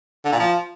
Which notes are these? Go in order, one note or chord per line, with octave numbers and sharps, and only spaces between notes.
D3
A#2
F3